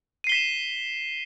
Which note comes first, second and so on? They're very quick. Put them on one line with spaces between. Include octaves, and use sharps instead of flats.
D#7 C7 G7 B6 E7